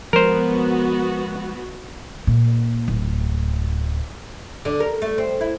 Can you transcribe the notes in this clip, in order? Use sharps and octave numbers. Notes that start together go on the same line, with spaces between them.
F3 G#3 B3 F#4 A#4 C5
A#2
D1
D3
A#4
A3
C4
E4